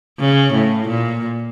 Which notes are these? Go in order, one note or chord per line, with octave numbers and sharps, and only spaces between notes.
C#3
A2
A#2